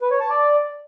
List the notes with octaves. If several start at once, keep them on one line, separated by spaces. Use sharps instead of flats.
B4
C#5
A5
D5